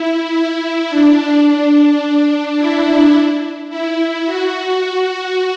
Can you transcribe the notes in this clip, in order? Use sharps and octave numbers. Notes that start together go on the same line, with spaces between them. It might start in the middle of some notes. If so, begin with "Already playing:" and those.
Already playing: E4
E4
D4
D4
D4
E4
E4
F#4